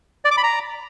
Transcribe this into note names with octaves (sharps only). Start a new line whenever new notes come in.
D5
D6
B5
A#5